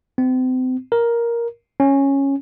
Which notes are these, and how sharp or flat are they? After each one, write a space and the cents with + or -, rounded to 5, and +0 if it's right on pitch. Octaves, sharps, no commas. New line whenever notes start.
C4 -35
A#4 +5
C#4 -10